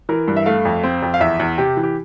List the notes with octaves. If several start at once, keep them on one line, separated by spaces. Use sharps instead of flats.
E3 A#4
G2
E5
A3 F5
F2
C4
F2
F5
E2 E5
E2
C3 G4
E3
G4